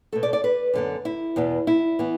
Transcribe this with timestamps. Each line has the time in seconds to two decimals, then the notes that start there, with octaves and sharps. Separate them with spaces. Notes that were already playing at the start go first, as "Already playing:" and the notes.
0.12 B2 A3 A4
0.23 D5
0.33 D5
0.44 B4
0.74 F#2 D3 B3
1.05 E4
1.36 E2 B2 B3
1.67 E4
1.99 E3 B3